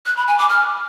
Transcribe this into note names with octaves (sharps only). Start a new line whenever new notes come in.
F#6
B5
G#5
D6
F6